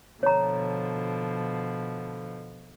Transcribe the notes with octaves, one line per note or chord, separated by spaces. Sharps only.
B2 D3 F3 C#5 A#5